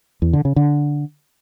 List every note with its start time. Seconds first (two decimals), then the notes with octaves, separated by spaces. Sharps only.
0.22 E2
0.33 D3
0.45 C#3
0.56 D3